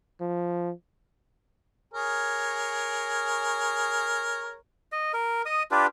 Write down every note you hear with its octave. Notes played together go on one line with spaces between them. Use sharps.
F3
G#4 A#4 C#5
D#5
A#4
D#5 D#6
D4 F4 G4 B4